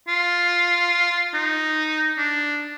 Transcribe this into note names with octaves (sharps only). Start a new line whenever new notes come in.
F4
D#4
D4